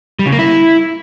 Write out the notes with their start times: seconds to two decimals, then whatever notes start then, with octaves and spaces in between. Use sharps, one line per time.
0.19 G3
0.26 C#3
0.32 A#3
0.39 E4